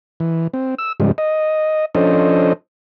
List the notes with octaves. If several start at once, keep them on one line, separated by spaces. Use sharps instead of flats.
E3
C4
E6
G#2 C#3 F3 G3 G#3
D#5
F3 C#4 D4 A4 C5 D#5